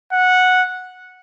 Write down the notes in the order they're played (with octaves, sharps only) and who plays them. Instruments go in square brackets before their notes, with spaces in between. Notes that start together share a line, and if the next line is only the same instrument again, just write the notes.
[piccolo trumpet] F#5